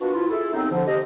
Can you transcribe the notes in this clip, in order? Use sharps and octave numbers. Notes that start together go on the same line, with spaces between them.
A#3 B3 D4 F4 F#4
C2 E4 F4
E4 G#4 A4
D#2 B3 C4 D#4
D3 F3
C3 G4 D#5